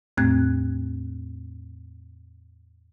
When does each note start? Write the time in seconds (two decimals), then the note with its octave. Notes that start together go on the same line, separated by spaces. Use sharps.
0.17 E2 A2 A3 C4 F#6 G#6